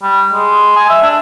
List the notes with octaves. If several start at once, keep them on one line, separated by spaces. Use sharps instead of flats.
G3
G#3
G#5
E5
D4